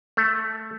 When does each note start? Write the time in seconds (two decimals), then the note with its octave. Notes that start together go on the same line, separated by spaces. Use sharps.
0.17 A3